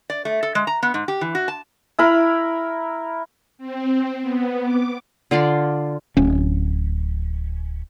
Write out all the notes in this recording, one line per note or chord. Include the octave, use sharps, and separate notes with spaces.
D5
A3
A4
G#3
A#5
B3
G#2
G4
E3
F#4
A5
E4 A#4 B5
C4
B3
D6
D3 F4 D5 C6
D1 C#4